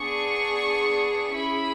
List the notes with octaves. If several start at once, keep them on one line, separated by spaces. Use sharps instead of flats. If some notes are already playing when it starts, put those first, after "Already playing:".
Already playing: B3 D4 G#4 C#6
C#4 E4 G#4 B5